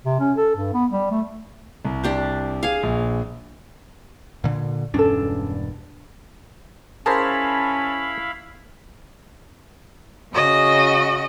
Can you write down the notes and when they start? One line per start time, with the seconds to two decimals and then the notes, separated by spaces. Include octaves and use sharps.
0.05 C3
0.19 C#4
0.37 A4
0.55 G2
0.74 B3
0.91 G3
1.11 A3
1.85 C2
2.04 D4 G4 C5
2.63 G#4 F5
2.83 A#1
4.44 A#2 D3
4.94 E1 G2 C#4 D4 A4
7.06 C#4 E4 G#4 A#4 C5 F5 A5 B5
10.33 C#3 F#4 D#5